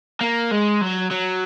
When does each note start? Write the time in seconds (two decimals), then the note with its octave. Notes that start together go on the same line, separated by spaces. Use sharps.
0.21 A#3
0.51 G#3
0.81 F#3
1.11 F#3